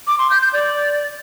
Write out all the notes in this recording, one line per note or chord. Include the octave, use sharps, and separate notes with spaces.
D6
C6
G6
G6
D5